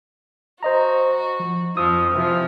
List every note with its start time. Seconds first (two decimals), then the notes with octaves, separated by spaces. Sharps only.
0.63 F#4 C5 D#5 A#5
1.40 F3
1.77 F2 F3 D#6 E6
2.12 C3 E3 F3